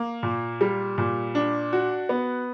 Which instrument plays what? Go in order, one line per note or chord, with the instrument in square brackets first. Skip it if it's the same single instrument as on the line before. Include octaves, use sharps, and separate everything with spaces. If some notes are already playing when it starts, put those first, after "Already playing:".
Already playing: [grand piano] A#3
A#2
G3
A#2
D4
F#4
B3